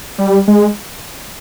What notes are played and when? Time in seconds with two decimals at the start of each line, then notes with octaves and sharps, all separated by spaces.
0.18 G3
0.48 G#3